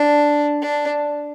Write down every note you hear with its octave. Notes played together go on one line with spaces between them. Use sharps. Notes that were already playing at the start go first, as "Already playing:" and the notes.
Already playing: D4
D4